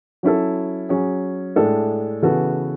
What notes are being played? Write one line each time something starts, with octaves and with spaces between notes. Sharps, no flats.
F#3 C#4 E4 A4
F#3 C#4 G#4
A2 G#3 D4 A4
C#3 E3 B3 F#4 A4